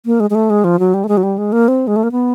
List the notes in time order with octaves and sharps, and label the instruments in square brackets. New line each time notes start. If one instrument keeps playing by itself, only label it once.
[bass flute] A#3
G#3
G#3
A3
G#3
F3
F#3
G3
A3
G#3
F#3
G3
G#3
A#3
C4
G#3
A3
A#3
B3